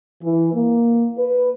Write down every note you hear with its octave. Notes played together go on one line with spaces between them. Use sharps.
E3
A#3
B4